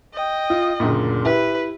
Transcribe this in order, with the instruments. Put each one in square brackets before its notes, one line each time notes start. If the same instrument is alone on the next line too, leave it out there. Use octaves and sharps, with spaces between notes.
[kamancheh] D#5 G5
[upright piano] F4
F#1 D2 A#2
[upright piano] E4 G4 [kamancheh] B4